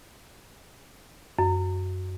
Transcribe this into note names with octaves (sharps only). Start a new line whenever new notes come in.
F#2